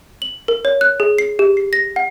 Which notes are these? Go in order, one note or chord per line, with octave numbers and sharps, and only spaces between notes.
F#7
A#4
C#5
F#6
G#4
C7
G4
C7
A#6
F#5